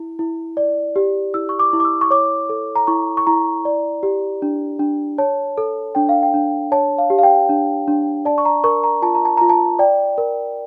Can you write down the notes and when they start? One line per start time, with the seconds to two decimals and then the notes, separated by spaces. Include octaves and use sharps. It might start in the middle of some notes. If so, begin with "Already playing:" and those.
Already playing: E4
0.19 E4
0.57 D5
0.96 G4
1.34 E4 E6
1.49 C#6
1.59 D6
1.73 E4
1.80 D6
1.85 E6
2.01 C#6
2.10 C#5 D6
2.49 A4
2.76 A#5
2.87 E4 C#6
3.17 C#6
3.27 E4 A#5
3.65 D5
4.03 G4
4.42 D4
4.79 D4
5.18 C#5 A5
5.58 A4
5.95 D4 G5
6.09 F5
6.23 G5
6.34 D4
6.72 C#5 A5
6.98 F5
7.10 G4
7.19 F5
7.23 G5
7.49 D4
7.87 D4
8.25 D5 A5
8.38 C#6
8.45 A#5
8.64 A#4 C#6
8.84 A#5
9.02 F4 A5
9.15 A#5
9.25 A5
9.37 F4 A#5
9.49 A5
9.79 D5 G5
10.18 A#4